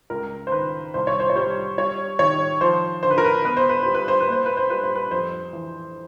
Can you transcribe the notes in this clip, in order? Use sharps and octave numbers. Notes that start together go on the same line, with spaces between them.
C#2 A#4
C5
D#3 B4
C2 C5
C#5
C5
C#5
G3 C5
G3 C#5
D#3 C#5
F3 C5
D3 C5
B4
A#4
B4
B3 B4
C5
B4
G3 C5
B4
C5
B4
A#3 C5
B4
C5
G3 B4
C5
B4
F2 C5
E3